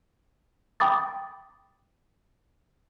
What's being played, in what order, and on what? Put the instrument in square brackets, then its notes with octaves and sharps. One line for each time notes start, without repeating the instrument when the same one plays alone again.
[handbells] G5 B5 D6 D#6 A6